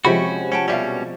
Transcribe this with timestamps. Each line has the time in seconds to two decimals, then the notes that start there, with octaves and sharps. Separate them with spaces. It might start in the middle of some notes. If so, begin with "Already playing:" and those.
0.05 C3 F3 G#3 C#4 F#4 G4 E5 B5
0.52 C#4 F#5 G5 A5
0.68 B2 G3 C#4 D5 E5 F5